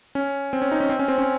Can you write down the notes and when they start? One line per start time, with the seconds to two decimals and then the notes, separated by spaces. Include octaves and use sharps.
0.15 C#4
0.53 C4
0.62 C#4
0.72 D#4
0.80 C#4
0.89 C4
0.99 C#4
1.08 C4
1.18 C#4